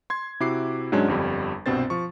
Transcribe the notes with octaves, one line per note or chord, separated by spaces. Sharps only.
C6 G#6
C3 E4 F#4 D6 C7
G#2 F#3 G#3 C#4 D4 G#6
G1 F2 G3
C2 G2 B2 C4 C5 A6
F3 C#6